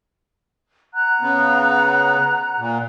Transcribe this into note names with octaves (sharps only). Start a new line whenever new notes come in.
F#5 A#5 F#6
C#3 B3
A#2